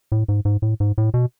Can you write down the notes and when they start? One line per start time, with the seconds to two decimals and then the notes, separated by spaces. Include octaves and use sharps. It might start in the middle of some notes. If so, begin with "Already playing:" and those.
0.12 A2
0.28 G#2
0.45 G#2
0.62 A2
0.80 G#2
0.98 A2
1.14 B2